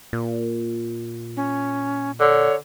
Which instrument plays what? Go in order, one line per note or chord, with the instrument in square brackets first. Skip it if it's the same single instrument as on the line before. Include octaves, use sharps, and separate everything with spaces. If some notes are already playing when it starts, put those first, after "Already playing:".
[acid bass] A#2
[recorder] C#4
[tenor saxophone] D3 [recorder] C#5